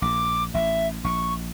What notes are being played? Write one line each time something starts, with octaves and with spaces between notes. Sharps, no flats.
A#1 A#2 D6
A1 E5
A#1 C#6